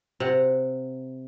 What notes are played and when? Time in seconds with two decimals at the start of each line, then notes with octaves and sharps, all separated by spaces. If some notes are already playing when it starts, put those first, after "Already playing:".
0.20 C3 F#5